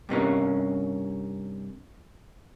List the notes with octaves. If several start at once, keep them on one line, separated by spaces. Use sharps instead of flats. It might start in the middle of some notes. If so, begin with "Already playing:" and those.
G2 C3 A#3 C#4